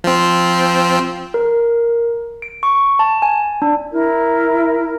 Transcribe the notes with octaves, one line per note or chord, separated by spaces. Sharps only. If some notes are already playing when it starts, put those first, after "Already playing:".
F3 C4
A#4
D7
C#6
A5
G#5
D4
E4 A#4